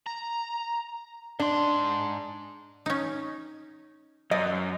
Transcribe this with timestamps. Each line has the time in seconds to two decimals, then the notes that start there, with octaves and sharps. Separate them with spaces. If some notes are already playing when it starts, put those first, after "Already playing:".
0.06 A#5
1.40 G#2 D4 C6
2.86 C#4 D#4
4.31 F#2 D5 D#5